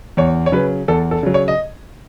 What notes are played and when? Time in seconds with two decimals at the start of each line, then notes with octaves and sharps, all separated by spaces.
0.17 E2 C#5
0.46 C#5
0.52 C#3 F#3 B4
0.88 E2 A4
1.11 A4
1.23 C#3 F#3
1.34 C#5
1.48 D#5